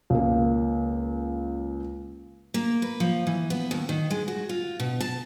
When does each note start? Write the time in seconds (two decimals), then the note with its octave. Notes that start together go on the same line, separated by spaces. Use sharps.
0.10 C#2 A#3
2.54 A#3
2.82 B4
3.00 F3
3.27 E3
3.50 B3
3.71 D#2
3.89 D#3
4.10 G#3
4.28 F#4
4.49 F4
4.80 B2
5.01 A5